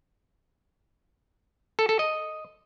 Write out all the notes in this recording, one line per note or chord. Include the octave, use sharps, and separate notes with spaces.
A4
A4
D#5